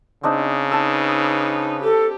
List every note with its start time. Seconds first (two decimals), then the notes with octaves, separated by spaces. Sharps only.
0.23 C#3 C4 D4 D#4
0.71 D#4 B4 A5 E6
1.83 G4 A4